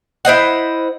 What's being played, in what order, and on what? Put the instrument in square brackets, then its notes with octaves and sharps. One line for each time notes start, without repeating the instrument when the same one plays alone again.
[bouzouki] E4 C5 D#5 F#5